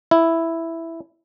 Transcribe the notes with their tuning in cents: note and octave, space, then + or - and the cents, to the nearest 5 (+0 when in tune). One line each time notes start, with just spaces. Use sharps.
E4 +0